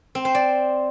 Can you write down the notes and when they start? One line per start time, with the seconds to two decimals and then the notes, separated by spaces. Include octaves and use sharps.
0.15 C4
0.25 C5
0.35 D5